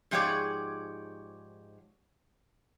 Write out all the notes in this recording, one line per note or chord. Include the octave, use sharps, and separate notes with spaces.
G#2 F3 G4 G#4 C#5 D5